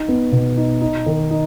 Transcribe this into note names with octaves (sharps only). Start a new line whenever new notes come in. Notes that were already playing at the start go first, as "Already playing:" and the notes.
Already playing: D#4
B3
B2
D#4
D#4
D#3
D#4